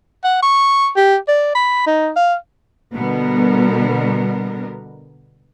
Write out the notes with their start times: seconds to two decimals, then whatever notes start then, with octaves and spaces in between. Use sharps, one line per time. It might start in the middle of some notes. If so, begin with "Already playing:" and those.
0.24 F#5
0.43 C#6
0.96 G4
1.28 D5
1.55 B5
1.87 D#4
2.16 F5
2.93 B2 D3 G3 B3 A#4